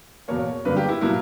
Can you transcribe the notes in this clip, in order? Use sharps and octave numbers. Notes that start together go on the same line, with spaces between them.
E2 B2 A#3 C#5
G2 D3 F#3 A#3 B4
G4
E4
B2 F#3 A#3 E4